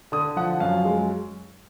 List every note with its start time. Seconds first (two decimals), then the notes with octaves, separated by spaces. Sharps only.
0.12 D3 D#6
0.36 F3 F#5
0.60 F#2 F5
0.85 G#3